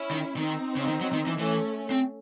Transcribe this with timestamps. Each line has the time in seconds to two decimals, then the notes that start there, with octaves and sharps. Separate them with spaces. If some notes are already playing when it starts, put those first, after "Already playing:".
Already playing: C#4 E4
0.11 D#3
0.36 D#3 C4 D#4
0.76 C#3
0.87 D#3
1.01 F#3
1.13 D#3
1.27 E3
1.38 E3 A3 C#4
1.91 C4